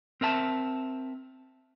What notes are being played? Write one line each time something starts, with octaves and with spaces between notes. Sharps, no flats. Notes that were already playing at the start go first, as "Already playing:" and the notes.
C4 A#4 E5 A5